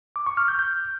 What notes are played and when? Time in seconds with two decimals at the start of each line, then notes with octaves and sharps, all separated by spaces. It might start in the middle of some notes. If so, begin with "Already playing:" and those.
0.16 D6
0.27 C#6
0.37 F6
0.48 G6
0.59 G6